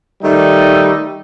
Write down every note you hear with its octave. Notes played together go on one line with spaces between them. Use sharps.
D#3 G3 A3 D#4